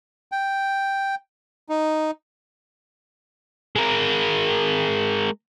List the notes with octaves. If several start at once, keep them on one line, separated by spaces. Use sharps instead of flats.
G5
D#4
G#3 A#4